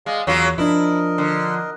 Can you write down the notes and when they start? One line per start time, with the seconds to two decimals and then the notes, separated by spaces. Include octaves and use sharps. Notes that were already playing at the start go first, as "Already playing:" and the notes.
0.06 G#3 D5 D#5 F5
0.27 E2 F#3 A#3 F4 G#4
0.58 F3 D4 E4 A#4 D#5
1.18 D3